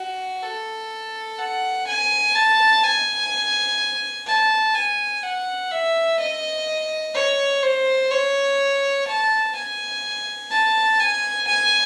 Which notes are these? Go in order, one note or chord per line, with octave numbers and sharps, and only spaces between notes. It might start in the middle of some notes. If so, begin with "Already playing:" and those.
Already playing: F#4
A4
F#5
G#5
A5
G#5
A5
G#5
F#5
E5
D#5
C#5
C5
C#5
A5
G#5
A5
G#5
G#5